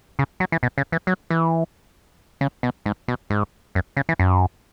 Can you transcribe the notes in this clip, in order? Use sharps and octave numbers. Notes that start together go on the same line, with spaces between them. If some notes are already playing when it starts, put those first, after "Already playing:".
C#3
F#3
E3
B2
C#3
E3
F#3
E3
C#3
B2
G#2
B2
G#2
F#2
C#3
E3
F#2